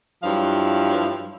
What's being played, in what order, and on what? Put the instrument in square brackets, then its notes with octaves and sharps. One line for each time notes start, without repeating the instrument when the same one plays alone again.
[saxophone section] G2 F3 F#3 E4 F5